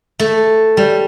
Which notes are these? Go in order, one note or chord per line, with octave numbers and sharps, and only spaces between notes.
A3
G3